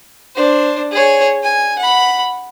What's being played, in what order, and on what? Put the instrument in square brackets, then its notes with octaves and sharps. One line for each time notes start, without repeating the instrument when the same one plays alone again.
[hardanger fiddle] D4 C5
G#4 C#5
G#5
F#5 B5